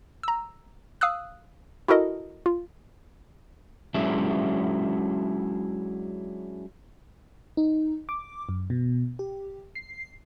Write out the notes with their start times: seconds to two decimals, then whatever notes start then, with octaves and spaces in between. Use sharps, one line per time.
0.23 A#5 E6
1.01 F5 D#6 E6 F#6
1.88 E4 F#4 A4 A#4 D#5
2.46 F4
3.94 F#3 G#3 C#4 D4 E4 E5
7.57 D#4
8.09 D6
8.49 F#2
8.70 B2
9.19 G4
9.75 C7